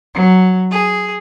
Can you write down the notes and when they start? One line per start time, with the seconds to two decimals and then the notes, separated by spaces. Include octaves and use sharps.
0.15 F#3
0.70 G#4